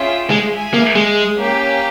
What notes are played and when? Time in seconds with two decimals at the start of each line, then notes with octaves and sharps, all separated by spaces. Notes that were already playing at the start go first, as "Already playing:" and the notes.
Already playing: C#4 F4 G#4 E5 G5
0.30 G#3
0.52 G#4 E5 G#5
0.74 A#3
0.95 G#3
1.38 A#3 C#4 G4